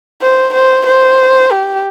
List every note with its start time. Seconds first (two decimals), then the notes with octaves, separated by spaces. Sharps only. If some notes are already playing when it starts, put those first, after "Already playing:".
0.22 C5
0.54 C5
0.86 C5
1.52 G4